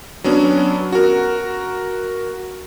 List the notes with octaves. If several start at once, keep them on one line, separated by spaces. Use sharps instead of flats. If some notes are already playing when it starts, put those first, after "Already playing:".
F#3 B3 C#4 D4
F#4 A#4